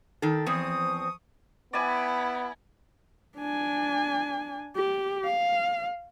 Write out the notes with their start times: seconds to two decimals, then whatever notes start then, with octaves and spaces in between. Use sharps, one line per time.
0.22 D#3 A4
0.46 E2 F3 C4 C#6 D#6
1.73 B3 E4 D5 G#5
3.37 D4 G#5
4.76 G4
5.25 F5